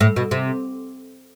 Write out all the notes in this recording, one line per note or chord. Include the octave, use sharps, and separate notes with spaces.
A2
B2
C3